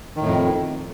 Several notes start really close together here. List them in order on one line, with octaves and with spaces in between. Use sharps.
D#3 A2 F2